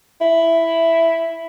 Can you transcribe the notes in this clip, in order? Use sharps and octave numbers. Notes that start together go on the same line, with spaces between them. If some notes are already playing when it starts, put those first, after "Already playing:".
E4